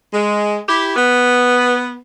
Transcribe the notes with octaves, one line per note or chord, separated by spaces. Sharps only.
G#3
E4 G4
B3